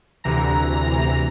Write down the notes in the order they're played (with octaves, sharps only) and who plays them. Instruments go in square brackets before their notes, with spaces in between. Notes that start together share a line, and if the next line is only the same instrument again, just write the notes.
[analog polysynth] D2 C3 E3 A#5